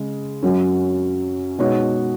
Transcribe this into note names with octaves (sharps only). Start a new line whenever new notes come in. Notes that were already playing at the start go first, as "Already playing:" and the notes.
Already playing: C#3 G#3
F#2 F#3 C#4
B2 G#3 D#4 F#4 C#5